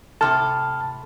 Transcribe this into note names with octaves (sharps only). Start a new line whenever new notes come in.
A2 C3 A4 A5 F6